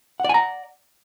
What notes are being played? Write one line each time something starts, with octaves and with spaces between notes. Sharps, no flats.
D5 F#5 G#5 A#5